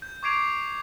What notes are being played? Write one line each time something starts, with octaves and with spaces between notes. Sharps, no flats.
G6
C#6 D6 G#6 C7 D7 F7